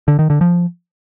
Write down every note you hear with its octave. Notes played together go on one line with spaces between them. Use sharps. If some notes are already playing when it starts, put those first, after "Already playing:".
D3
D#3
D3
F3